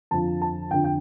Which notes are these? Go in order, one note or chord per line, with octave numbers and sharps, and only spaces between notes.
F2 D3 F3 A5
A5
F2 D3 F3 G5
G5